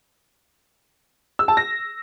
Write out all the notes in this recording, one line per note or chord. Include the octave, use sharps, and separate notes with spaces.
E6
A5
A#6